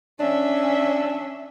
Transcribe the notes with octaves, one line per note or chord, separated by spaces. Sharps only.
C#4 D4 E5